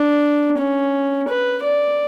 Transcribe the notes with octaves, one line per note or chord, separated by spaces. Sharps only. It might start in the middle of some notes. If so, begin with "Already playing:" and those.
Already playing: D4
C#4
B4
D5